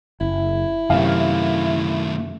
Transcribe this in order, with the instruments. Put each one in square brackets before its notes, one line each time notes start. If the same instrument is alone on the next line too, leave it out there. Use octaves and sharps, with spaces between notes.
[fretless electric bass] F#1 [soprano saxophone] E4
[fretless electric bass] F#2 C3 [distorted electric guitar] D#3 A3 [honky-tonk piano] F5